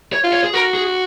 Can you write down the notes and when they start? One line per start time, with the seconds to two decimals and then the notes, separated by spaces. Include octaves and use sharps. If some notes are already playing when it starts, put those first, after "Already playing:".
0.13 C#5
0.24 F4
0.33 C#5
0.44 G#4
0.53 F#4 A#4
0.75 G#4